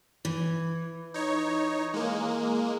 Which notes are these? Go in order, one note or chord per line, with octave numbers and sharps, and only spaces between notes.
E3
D#4 C#5
G#3 A#3